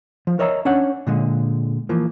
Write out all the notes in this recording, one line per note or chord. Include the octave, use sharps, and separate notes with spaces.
F3
A#4 C#5 D#5 E5 A5 A#5
C#4 D4 C#5 F#5
A#2 D3 G#3
E3 F3 A#3